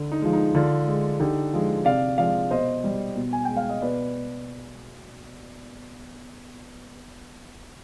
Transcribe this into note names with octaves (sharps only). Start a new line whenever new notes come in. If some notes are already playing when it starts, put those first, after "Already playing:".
Already playing: D3
D#4
F3 G#3
D#4
D3 D4 F4
G#3
D3 D#4 G4
F3 G#3
C3 D5 F5
F3 G#3 D5 F5
B2 C5 D#5
G3
B2
G#5
G#3 G5
F5
D#5
B2 B4 D5